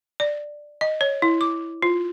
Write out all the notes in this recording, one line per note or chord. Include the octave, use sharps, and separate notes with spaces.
D5
D#5
C#5
E4
D6
F4